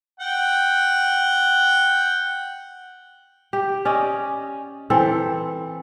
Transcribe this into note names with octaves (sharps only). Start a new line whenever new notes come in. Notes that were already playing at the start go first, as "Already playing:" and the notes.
F#5 G5
G4
C#4 D5 D#5
E3 C4 A4